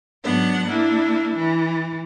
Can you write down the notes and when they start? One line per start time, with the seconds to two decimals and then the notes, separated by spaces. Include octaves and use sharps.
0.24 G#2 F#3 B3 D4 F#5
0.67 A#3 D4 E4
1.35 E3